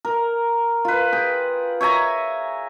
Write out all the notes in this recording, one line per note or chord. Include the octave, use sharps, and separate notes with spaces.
A#4
F4 B4
G#4 G5
C#5 E5 G#5 A#5